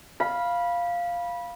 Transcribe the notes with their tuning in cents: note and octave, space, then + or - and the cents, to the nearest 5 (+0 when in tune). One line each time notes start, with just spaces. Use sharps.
F5 +0 B5 -20